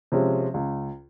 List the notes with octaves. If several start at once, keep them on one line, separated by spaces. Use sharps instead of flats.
C3 F3 G#3 C#4
C#2